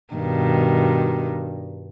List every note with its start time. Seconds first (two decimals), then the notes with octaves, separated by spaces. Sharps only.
0.14 G2 B2 D#3